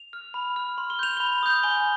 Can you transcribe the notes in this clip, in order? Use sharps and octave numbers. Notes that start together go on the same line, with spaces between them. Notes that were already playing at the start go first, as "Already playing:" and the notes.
Already playing: F7
F6
B5
F6
C6
G7
G6 F7
B5 G7
D#6 G6
G#5 G7